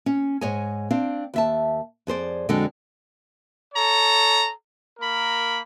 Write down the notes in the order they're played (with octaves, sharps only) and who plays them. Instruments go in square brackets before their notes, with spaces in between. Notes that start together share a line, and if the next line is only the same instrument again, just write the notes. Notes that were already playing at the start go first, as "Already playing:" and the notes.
[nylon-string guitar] C#4
G#2 G#4 C#5 D#5 G#5
C4 D4 F5
D#2 E5 A5
F2 G#4 C5 D5
F2 D3 G#3 F#4 A4 G5
[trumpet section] A4 C#5 A#5
A#3 A#4 B5